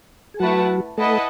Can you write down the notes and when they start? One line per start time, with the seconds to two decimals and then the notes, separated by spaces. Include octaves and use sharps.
0.34 G#4
0.40 F#3 A3 E4 F#4 B4 F#5 A5
0.98 A3 E4 A4 B4 D#5 F#5 A5